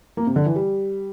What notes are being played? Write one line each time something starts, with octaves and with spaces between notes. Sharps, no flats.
A#3
C3
D3
E3
G3